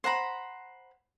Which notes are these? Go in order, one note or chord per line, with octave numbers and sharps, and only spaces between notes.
C5 F#5 A#5 B5